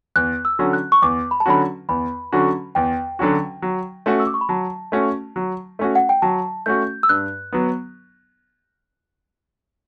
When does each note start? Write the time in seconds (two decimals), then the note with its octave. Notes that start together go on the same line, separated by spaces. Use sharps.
0.16 E2 F#6
0.45 E6
0.59 D3 F#3 C#4 F#4
0.73 F#6
0.92 C#6
1.02 E2 D6
1.31 B5
1.40 A5
1.46 D3 F#3 C#4 F#4 B5
1.89 E2 B5
2.32 D3 F#3 C#4 F#4
2.75 E2 G5
3.19 D3 F#3 C#4 F#4
3.62 F#3
4.06 A3 C#4 F#4
4.20 E6
4.27 D6
4.34 C#6
4.41 B5
4.49 F#3 A5
4.92 A3 C#4 F#4
5.36 F#3
5.79 A3 C#4 F#4
5.95 F#5
6.09 G5
6.22 F#3 A5
6.66 A3 C#4 F#4 G6
7.03 E6
7.09 G2 F#6
7.52 F#3 B3